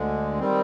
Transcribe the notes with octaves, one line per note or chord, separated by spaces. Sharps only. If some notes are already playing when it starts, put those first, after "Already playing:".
Already playing: D2 D3 G#3
D#3 G3 C4